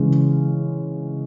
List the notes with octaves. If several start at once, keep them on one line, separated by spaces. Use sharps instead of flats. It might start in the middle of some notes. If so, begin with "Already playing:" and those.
Already playing: C#3 E3 G#3 C#4